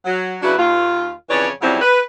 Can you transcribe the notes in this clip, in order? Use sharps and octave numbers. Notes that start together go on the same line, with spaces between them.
F#3
C#3 F#3 D4 E4 F#4 B4
D#2 F4
F2 C#3 E3 C#5 D5
F2 C#3 F#3 G3 C4 E4
B4